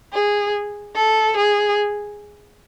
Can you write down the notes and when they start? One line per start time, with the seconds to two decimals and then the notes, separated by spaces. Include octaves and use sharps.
0.13 G#4
0.96 A4
1.37 G#4